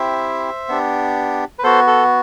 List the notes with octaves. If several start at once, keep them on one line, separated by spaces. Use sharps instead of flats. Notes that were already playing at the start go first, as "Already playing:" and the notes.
Already playing: C4 E4 G4 C5 E5
B3 D4 G4
B4
B3 F#4 A4 C5
A4